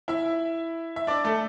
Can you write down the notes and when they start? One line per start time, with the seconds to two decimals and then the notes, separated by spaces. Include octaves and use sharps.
0.08 E4 E5
0.96 E5
1.07 D4 D5
1.24 A3 A4